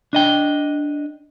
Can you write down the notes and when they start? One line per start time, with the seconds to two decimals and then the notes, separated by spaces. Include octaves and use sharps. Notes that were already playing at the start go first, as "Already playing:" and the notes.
0.13 D4 D#5 G5